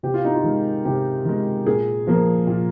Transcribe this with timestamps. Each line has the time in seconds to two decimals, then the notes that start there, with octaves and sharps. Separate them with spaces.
0.03 C3 G4
0.14 F4
0.25 D#4
0.35 F4
0.44 D#3 G#3
0.85 C3 G4
1.25 D#3 G#3
1.66 A#2 G#4
2.07 F3 A#3
2.47 A#2